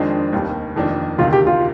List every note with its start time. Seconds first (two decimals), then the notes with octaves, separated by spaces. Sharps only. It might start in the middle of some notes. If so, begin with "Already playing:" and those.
Already playing: F2 D#3 G#3 C4 D4
0.33 F1 D#2 D#3 G3
0.76 F1 F2 D#3 A#3 D4
1.18 D2 C3 D#3 F4
1.33 G4
1.47 F4